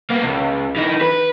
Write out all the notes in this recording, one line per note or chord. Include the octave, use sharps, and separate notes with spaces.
A#3 B3
C#2
E3 D#4
B4